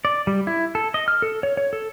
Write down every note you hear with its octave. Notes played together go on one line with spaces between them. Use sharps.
D5
G3
E4
A4
D#5
F6
A4
C#5
C#5
A4